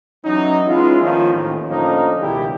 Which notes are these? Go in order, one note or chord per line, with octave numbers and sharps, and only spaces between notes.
E3 F#3 C#4 D#4
G#3 B3 C#4 E4 F4
D#3 F3 A#3 C#4 F4
A1 D#2
A2 D3 F3 A#3 C#4 D#4
C#2 B2 D#3 G3 E4 G4